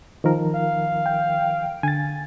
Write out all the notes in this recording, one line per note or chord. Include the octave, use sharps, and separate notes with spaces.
D#3 F3 A#4
F5
G5
D3 G#5 A6